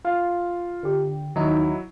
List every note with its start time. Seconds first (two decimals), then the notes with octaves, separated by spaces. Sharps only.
0.04 F4 F5
0.83 D3 G4
1.36 D#2 F#3 D#4 E4 A#5